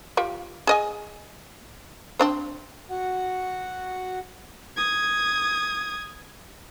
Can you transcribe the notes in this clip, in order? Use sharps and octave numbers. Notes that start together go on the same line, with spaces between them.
F4 G4
G#4 D#5 G#5
C4 D4 C5
F#4 F#5
D#6 G#6